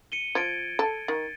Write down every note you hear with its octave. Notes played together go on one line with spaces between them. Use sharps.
C#7 D#7 G7
F3 G#6 A6 D7
A4
D#3 A6